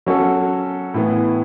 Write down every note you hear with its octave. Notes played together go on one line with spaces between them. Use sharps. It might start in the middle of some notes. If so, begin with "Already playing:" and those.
F#3 C#4 F#4 A4
A2 E3 B3